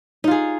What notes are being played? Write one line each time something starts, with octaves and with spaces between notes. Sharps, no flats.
D#4 F4 G#4